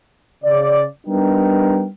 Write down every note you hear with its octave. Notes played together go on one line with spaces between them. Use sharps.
C#3 D5
G3 B3 D4 D#4 A#4 G5